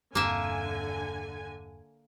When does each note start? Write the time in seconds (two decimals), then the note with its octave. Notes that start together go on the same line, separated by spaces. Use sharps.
0.15 E1 G2 D3 A#3 C4 E5 G#5